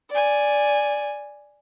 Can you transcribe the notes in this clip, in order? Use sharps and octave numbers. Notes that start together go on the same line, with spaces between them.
D5 G#5